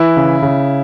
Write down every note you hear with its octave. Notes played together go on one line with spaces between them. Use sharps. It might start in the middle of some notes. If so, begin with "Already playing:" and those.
Already playing: E3 E4
C#3
C#3